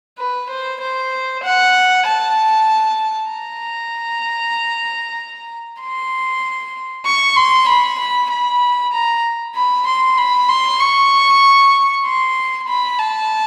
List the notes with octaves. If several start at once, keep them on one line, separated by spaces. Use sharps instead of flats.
B4
C5
C5
F#5
A5
A#5
C6
C#6
C6
B5
B5
B5
A#5
B5
C6
B5
C6
C#6
C6
B5
A5